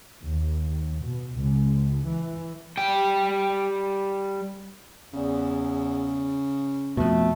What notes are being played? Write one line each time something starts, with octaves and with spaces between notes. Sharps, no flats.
D#2
B2
C#2
E3
G3 G5
E2 C#3
F2 B2 A3